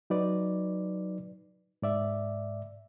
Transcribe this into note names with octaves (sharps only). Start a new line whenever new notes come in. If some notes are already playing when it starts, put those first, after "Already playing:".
F#3 D#4 B4 D5
G#2 D5 E5